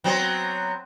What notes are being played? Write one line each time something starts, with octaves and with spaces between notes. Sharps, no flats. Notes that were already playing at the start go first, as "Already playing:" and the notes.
F#3 B3 C4